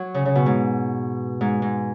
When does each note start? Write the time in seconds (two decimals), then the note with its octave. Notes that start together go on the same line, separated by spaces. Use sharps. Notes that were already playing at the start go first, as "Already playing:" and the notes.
Already playing: F#3
0.14 C#3
0.26 C#3
0.35 B2
0.46 G#2
1.41 G#2
1.62 G#2